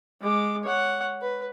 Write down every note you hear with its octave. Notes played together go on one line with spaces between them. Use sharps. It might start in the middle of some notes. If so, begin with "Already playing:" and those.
G#3 D6
C#5 F#5
B4